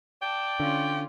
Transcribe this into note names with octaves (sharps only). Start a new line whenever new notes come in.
D5 G5 A5
D3 C#4 F4